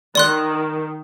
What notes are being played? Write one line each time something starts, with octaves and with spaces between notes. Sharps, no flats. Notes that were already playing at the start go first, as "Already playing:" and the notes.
D#3 D5 C6 F#6